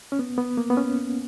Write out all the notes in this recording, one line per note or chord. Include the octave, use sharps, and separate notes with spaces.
C#4
B3
B3
A#3
B3
C#4